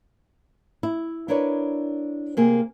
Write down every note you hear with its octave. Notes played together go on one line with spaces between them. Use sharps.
E4
D4 E4 A#4 B4 C#5 D5
C3 A#3 G#4